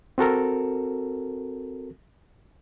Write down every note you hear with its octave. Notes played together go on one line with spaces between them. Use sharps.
C4 F#4 A4 A#4